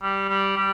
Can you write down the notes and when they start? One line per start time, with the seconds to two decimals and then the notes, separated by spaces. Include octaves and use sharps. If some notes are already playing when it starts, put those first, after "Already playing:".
0.02 G3
0.28 G3
0.57 G3